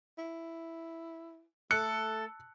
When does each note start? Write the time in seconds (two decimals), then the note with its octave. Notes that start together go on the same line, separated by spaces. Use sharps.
0.18 E4
1.71 A3 A4 F#6 C#7